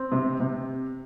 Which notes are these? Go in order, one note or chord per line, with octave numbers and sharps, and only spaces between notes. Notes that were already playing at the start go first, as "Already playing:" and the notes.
Already playing: C4
C3
C3